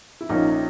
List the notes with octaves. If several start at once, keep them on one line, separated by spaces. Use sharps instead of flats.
E4
A#1 A#2 F3 C#4 D#4